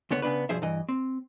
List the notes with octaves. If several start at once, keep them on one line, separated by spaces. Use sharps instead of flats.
C#2 D3 B3 C#5
C#3 B3 D4 B4
B1 G2 F3 G#4 C5 E5
G2 E3 D#5
C4